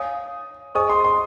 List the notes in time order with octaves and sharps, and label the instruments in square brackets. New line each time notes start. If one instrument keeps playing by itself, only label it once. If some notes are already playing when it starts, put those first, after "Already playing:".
Already playing: [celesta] C#5 F5 G#5 [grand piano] D#6
[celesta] G#4 C5 D#5 G#5 C#6 [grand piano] D#6
[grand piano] C6
C6